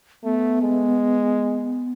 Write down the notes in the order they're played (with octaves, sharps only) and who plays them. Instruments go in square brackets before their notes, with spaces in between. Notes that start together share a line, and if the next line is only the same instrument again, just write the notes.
[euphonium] A3 [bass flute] B3
[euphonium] G#3